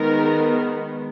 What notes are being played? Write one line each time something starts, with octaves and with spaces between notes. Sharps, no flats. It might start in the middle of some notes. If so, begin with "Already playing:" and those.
Already playing: D#3 G#3 B3 A#4